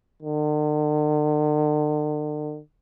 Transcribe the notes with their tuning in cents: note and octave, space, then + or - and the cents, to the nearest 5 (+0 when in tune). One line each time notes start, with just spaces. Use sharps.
D3 +45